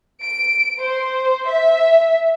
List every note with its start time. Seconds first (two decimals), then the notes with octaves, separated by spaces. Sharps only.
0.22 D7
0.79 C5
1.47 E5